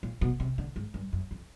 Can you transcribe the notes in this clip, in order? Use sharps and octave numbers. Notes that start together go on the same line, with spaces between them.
A#2
B2
C3
D3
G#2
G2
F#2
F2